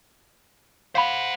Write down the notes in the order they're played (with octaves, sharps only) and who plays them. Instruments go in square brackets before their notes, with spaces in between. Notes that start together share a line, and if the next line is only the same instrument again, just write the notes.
[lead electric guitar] C5 F#5 [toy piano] F5 B5